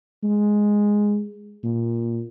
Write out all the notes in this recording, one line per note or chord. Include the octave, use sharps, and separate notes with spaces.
G#3
A#2